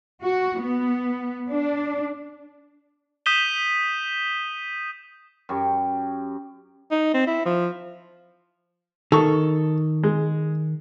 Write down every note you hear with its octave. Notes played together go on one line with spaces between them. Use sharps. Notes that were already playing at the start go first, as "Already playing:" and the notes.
F#4
B3
D4
D#6 G6 B6 D#7 E7 G7
F#2 G4 C#6 D6
D#4
C4
E4
F3
D#3 A4 C#6
G#3